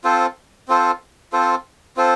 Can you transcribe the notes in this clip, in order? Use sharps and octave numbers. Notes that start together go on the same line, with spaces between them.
C4 F4 A4 C5
C4 F4 A4 C5
C4 F4 A4 C5
C4 F4 A4 C5